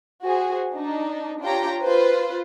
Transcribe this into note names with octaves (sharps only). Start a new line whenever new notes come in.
F#4 G#4 C5
D4 D#4
D4 F4 G4 C#5 G5 A#5
F4 B4 C5